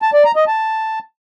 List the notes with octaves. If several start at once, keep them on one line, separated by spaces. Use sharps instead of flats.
A5
D5
A#5
D#5
A5